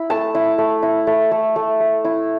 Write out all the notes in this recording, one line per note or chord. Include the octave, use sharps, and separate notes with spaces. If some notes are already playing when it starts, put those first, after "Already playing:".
Already playing: E4 B5
A3 A5
E4
A3
E4
A3
A3
A3
A3
E4